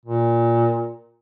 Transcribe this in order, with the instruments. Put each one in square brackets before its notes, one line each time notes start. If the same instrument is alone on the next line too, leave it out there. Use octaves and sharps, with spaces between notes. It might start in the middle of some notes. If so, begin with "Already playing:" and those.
[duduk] A#2